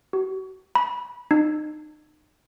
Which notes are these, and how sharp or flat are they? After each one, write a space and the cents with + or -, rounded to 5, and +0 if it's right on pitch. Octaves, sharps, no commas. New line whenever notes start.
F#4 +40
B5 -20
D#4 -35